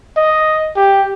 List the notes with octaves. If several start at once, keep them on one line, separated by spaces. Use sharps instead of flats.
D#5
G4